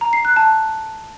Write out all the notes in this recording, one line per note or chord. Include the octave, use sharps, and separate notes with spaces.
A#5
C7
F#6
A5